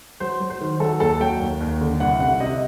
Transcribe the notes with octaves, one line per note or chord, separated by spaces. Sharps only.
F#3 C5
F#3
C5
D#3
F#3 A4
D#2 A4
F#3 G5
D#2
D#2
D3
C2 F#5
C3 F#5
C3 D#5